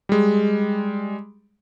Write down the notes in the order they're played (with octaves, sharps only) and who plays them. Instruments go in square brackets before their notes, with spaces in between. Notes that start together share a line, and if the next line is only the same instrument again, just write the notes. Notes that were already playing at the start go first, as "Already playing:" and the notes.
[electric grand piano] G3 G#3